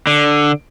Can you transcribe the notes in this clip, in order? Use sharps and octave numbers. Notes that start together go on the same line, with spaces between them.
D3